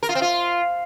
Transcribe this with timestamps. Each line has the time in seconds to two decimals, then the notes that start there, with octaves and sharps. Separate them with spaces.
0.03 A#4
0.09 F4
0.15 C4
0.22 F4